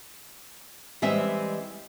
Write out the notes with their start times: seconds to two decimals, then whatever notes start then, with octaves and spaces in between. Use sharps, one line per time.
1.02 E3 G3 G#3 C4 E5